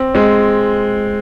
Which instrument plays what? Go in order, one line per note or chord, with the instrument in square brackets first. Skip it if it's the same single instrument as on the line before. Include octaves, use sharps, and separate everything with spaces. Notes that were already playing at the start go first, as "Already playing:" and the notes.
Already playing: [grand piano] C4
G#3 C4